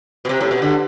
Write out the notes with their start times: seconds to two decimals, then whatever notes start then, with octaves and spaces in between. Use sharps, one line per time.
0.25 B2
0.29 C3
0.40 A2
0.51 B2
0.62 D3